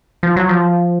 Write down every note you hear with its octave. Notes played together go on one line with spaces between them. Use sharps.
F3
F#3
F3